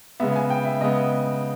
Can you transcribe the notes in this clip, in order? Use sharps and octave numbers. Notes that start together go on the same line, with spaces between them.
C#3 G#3 B3 E5
G#5
G5
E5
C#3 G#3 B3 D#5